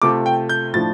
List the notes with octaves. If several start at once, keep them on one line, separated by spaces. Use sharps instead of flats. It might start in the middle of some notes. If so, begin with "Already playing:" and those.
C3 A3 F4 D6
G5
G6
A2 F3 D4 A6